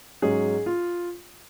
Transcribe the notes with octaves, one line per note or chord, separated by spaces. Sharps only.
G#2 F#3 C#4 G#4
F4